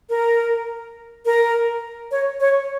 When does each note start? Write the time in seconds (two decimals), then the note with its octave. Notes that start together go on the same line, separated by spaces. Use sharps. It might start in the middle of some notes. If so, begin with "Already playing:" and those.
0.09 A#4
1.25 A#4
2.11 C#5
2.40 C#5